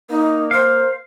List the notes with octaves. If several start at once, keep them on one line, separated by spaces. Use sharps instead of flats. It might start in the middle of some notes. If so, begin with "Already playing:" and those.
A#3 D#4
C5 F5